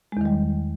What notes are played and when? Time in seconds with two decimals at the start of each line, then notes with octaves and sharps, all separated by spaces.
0.12 G#3
0.17 E2
0.21 D#3
0.25 G3